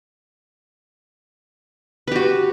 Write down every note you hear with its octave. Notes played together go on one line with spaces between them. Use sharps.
F#4 G4 B4